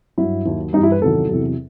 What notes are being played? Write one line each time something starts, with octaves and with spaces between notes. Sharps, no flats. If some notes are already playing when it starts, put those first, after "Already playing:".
G2 F#3 E4
D#2 D#3 F#3
G2 E3 G3 D#4
E4
B4
E2 C3 D#3 F#3 A4
E2 C3 F#3